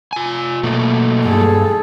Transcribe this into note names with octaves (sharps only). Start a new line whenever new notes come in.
F4 G#5
B2 F#3 A3 A#3
G2 G#4 A4